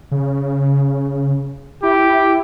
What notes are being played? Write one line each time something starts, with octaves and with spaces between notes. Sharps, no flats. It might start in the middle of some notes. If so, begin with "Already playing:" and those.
C#3
E4 G4